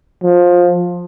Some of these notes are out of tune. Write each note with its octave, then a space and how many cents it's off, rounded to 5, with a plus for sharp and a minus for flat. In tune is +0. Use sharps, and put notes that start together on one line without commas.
F3 +15